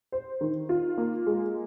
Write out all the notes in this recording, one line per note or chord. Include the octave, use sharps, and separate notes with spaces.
C5
D#3
F4
A#3
G#3